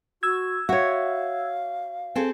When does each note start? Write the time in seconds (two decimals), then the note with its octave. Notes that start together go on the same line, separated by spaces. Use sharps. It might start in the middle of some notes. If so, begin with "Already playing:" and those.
0.23 F#4 E6 G#6
0.69 F#4 C#5 E5 F5
2.15 C4 G#4 A4